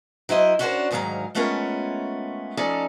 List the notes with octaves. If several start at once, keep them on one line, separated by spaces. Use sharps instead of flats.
F#3 E4 C5 D#5
C#4 D4 F#4 G4 A#4 C5
D2 G#2 D#3 F#3 F5 A#5
G#3 A3 B3 C#4 F4 A#4
F3 C#4 D#4 A4 D5 F5